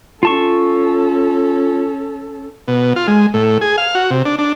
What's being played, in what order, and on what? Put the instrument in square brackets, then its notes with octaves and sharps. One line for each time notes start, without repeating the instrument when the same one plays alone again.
[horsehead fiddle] C#4 A4 [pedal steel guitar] F4 A5 C#6
[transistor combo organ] B2
F4
G#3
A2
G#4
F5
F#4
C3
D4
D4